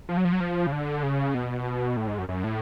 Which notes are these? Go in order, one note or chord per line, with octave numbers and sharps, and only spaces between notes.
F3
F#3
F3
F#3
F3
C#3
D3
C#3
B2
A2
G#2
F#2
F#2
A2